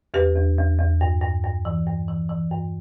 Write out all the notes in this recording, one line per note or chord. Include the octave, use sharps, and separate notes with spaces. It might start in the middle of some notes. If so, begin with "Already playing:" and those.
E2 G4 B4
E2
E2
E2
G2
G2
G2
E3
G2
E3
E3
G2